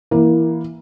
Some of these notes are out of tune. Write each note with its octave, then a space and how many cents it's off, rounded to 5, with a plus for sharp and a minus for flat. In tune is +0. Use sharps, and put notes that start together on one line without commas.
E3 +0 A#3 +15